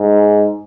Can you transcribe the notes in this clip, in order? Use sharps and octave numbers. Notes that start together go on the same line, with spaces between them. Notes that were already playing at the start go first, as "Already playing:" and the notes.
Already playing: G#2